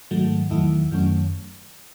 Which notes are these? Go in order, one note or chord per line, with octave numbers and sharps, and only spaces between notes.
G#2 D#3 F#3 A3
E2 D#3 F#3 A3 E4
F#2 D#3 F#3 A3 C#4